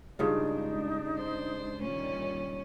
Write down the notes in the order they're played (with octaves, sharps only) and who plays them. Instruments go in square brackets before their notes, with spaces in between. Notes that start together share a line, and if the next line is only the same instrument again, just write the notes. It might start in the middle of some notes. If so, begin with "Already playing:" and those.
[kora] G2 C#3 F4 [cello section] G#3 D4 [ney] D#4
[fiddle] C5
[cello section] A#2 D#3 G3 [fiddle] C#4